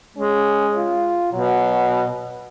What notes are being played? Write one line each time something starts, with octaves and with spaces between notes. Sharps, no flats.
G#3 C#4
F4
B2 F#3